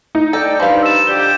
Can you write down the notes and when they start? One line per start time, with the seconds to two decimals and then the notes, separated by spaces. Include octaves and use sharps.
0.15 D#4
0.33 A4 D5 G5
0.60 G2 F3 F5 B5
0.83 E6 A6 E7
1.07 D3 F4 G4 G7